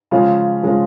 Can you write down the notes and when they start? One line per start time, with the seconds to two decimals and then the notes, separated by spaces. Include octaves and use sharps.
0.11 C#3 F3 G#3 C#4 F4
0.63 C#3 F3 G#3 C#4 F4